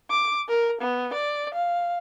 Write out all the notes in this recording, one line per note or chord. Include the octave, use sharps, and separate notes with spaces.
D6
A#4
B3
D5
F5